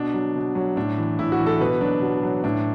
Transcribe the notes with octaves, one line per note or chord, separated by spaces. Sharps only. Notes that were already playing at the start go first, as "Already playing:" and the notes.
Already playing: B2 D4
F#3
B2
F#3
A2 D4
E3
A2 E4
F#4
E3
A4
B2 B4
F#3 D4
B2
F#3
A2 D4